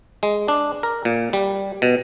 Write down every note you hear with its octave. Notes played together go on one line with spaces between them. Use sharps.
G#3
D4
A#4
A#2
G3
B2